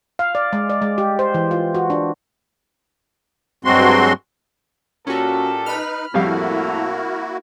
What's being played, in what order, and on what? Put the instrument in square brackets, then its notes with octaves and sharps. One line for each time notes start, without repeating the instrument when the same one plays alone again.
[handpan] F5
D5
G#3
D5
G#3
G4
C5
E3
F4
F#4
D4
[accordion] G2 F#3 G#3 C4 F#4 C6
[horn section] A#2 G4 A4 [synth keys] C#4 F#4
[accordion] D#4 B4 [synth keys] B5 F6
[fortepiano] F2 G3 F5 [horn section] A2 A4 [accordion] A#3 E4 F#4